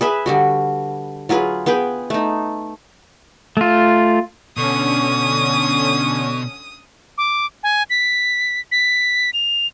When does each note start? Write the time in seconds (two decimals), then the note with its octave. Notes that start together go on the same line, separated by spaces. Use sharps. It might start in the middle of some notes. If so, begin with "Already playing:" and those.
0.01 G#4 B4 E5
0.26 D3 G3 F#4
1.29 F#3 F4 G#4 B4
1.66 B3 G#4 B4 G5
2.10 A3 D#4
3.57 A3 F4
4.57 B2 D3 C#4 C#6 D#6
7.18 D6
7.63 G#5
7.90 B6
8.72 B6
9.33 F7